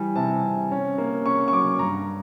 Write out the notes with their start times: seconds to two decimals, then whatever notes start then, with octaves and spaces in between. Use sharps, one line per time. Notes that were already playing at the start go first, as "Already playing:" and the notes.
Already playing: E3 G3 G#5
0.16 C3 A5
0.43 C3
0.71 C#4
0.98 A#3
1.26 C#4 C#6
1.48 C#6
1.52 F#3 D6
1.79 G2 A#5